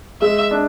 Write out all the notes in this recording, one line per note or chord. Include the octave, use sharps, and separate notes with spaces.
G#3 E5
D4